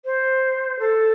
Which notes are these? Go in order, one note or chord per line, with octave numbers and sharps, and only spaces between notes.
C5
A4